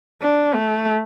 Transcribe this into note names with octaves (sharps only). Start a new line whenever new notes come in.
D4
A3